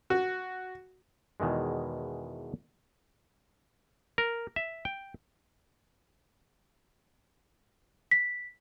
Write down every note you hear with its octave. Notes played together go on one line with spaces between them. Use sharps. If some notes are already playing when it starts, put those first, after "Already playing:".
F#4
E2 B2 D#3 E3 G#3
A#4
E5
G5
B6